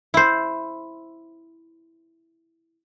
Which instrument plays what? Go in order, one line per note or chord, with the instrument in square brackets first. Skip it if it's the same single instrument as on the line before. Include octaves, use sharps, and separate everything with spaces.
[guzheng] E4 C5